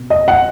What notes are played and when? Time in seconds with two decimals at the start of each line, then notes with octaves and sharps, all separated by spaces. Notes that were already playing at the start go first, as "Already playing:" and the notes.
Already playing: B2
0.10 D#5
0.28 F#5